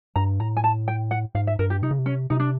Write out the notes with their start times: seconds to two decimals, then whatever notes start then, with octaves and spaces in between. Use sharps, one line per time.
0.16 G2 A#5
0.39 A2 A#5
0.57 G#5
0.64 A5
0.88 G5
1.11 F#5
1.35 G#2 F5
1.47 E5
1.59 G2 A#4
1.70 G4
1.82 C3 D#4
1.91 C#3
1.99 C3
2.06 C#4
2.30 C3 D#4
2.40 D4